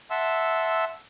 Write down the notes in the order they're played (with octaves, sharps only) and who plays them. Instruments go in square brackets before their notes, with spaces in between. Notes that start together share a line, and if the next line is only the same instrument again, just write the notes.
[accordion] E5 F#5 A5 C6 E6